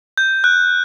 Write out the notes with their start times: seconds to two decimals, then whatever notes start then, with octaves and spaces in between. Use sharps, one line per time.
0.18 G6
0.44 F#6